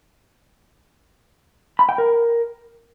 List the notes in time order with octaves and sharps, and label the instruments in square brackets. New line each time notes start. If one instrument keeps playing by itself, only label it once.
[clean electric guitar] B5
G5
A#4